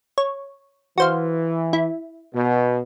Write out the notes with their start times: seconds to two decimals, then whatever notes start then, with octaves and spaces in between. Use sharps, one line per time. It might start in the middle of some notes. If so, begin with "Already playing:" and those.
0.18 C#5
0.98 E3 F#4 C5 F5
1.73 E4
2.34 B2